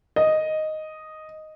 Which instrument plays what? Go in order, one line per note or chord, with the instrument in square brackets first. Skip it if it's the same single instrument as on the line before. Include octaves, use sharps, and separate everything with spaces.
[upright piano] D#5